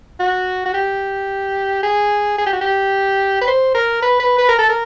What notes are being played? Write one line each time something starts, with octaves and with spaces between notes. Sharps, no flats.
F#4
F#4
G4
G#4
G#4
G4
F#4
G4
B4
C5
A#4
B4
B4
B4
A#4
A4
A#4